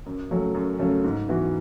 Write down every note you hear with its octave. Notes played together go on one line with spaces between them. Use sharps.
F#2
C#3 F#3 A3 C#4
F#2
C#3 F#3 A3 C#4
G#2
E3 B3 F#4